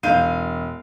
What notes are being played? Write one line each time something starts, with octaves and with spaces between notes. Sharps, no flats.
E1 F5 G6 D#7